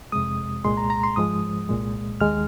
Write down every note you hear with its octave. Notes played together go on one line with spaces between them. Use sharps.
F2 C3 G#3 D#6
C2 A#2 G#3 C6
A#5
A#5
C6
G#2 F3 G#3 D#6
C2 A#2 G#3
D#2 D#3 G#3 F6